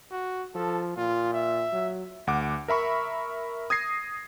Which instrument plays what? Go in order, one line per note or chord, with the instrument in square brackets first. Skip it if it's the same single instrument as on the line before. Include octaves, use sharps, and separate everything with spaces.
[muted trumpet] F#4
[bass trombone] F3 [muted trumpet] A4
[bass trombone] A#2 [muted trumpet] F4
[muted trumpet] E5
[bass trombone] F#3
[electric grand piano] D2 F#5 D6
A#4 E5 B5 C#6
D#6 G#6 A#6 C7